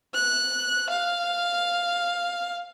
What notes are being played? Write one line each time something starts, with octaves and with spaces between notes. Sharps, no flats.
F#6
F5